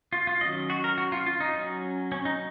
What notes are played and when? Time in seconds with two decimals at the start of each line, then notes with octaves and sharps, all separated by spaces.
0.13 F4
0.27 F4
0.41 D#3 F#3 C#4 D#5
0.70 F#4
0.84 A#4
0.98 F#4
1.12 F4
1.26 F4
1.40 D#4
1.54 F#3 C#4
2.12 C#4
2.25 D#4